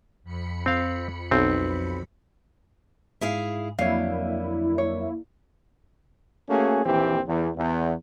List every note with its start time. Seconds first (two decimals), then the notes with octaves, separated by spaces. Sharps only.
0.23 F2 B5 C#7
0.66 C4 F5
1.31 B1 C4
3.21 G#2 E4 G#4 F5
3.79 F2 D3 F#3 A#3 E4 C#5 F5
4.78 C#5
6.49 A3 A#3 C#4 F#4 G#4
6.85 A#1 D#2 E3 C4 G4
7.26 E2
7.56 E2